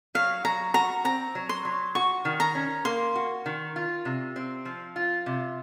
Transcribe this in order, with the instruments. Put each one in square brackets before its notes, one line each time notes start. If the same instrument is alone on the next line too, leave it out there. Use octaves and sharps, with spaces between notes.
[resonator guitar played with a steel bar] F#3 [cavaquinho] F5
[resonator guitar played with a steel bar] F#3 [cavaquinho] A#5
[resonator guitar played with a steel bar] F#4 [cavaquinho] A#5
[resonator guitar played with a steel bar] C4 [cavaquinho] A#5
[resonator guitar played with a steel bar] F#3
[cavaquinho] C6
[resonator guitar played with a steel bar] F#3
[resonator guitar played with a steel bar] F#4 [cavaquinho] C#6
[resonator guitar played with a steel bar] D#3
[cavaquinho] A#5
[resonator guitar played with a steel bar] C#4
[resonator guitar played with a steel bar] A#3 [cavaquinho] C6
[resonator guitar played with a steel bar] F#4
D#3
F4
C3
C4
F3
F4
C3